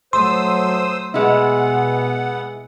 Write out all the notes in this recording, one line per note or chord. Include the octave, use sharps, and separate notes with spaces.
F#3 A3 C5 C6 D#6 E6
B2 G#3 B3 E4 F#5